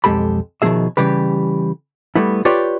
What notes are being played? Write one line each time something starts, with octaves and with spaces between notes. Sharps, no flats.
B1 F2 G#3 G4 A4 B5
B2 D#3 F3 A#3 G#4 E5
C#3 E3 G3 G4 B4
G3 A3 B3 E4
F4 G4 B4 C#5 D5 G5